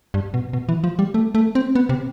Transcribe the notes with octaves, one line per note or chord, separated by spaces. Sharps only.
G2
B2
B2
E3
F3
G3
A3
A3
C4
B3
C3